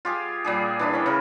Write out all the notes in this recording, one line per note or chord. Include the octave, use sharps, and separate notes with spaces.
F4 G4 G#4
A#2 G3 G4 G#4
E3 D4 E4
C#4 B5
C#3 A#4